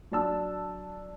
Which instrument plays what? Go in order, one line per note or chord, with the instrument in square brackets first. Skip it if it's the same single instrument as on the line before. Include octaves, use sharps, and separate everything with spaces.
[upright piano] F#3 D4 A5 E6